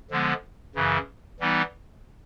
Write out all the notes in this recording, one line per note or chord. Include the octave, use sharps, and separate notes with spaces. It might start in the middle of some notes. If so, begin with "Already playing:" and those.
D3 F3 G#3 B3
F#2 C#3 E3
E3 G3 B3 D#4